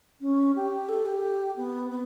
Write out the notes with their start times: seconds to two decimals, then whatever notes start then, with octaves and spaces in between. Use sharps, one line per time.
0.21 C#4
0.55 G4
0.88 A4
1.05 G4
1.56 B3
1.90 B3